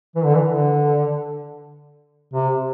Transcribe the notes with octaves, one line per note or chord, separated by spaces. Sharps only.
E3
D3
E3
D3
C3